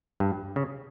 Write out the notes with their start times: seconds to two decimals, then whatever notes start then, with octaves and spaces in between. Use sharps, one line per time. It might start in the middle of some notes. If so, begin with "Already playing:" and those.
0.20 G2
0.56 C#3